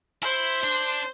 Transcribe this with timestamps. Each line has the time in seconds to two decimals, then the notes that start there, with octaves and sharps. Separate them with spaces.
0.22 E4 C5
0.64 D4